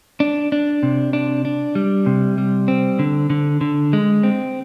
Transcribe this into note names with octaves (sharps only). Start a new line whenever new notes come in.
D4
D4
C3
D4
D4
G3
C3
G3
C4
D3
D3
D3
G#3
C4